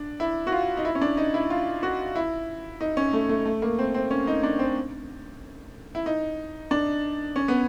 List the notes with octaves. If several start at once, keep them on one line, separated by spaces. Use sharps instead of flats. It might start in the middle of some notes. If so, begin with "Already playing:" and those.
Already playing: D4
E4
F#4
F4
D#4
E4
C#4
D4
D#4
E4
F4
F#4
E4
D#4
C#4
A3
A3
A3
A#3
C4
C4
C#4
D#4
D4
C4
E4
D#4
D4
C#4
B3